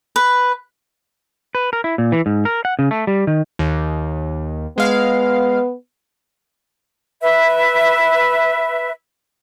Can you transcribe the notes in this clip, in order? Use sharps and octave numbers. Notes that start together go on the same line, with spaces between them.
B4
B4
A#4
E4
A#2
E3
G#2
A#4
F#5
C#3
A3
G3
D#3
D#2
G#3 B3 F5
B4 E5